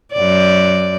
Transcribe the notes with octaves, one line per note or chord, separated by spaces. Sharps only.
F#2 D5